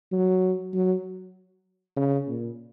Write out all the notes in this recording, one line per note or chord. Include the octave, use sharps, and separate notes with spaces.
F#3
F#3
C#3
A#2